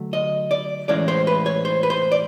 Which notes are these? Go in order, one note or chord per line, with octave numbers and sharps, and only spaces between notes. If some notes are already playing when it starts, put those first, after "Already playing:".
Already playing: D3 F#3 A3
D#5
D5
A2 E3 G#3 C#4 D5
C5
B4
C#5
C5
B4
C5
D5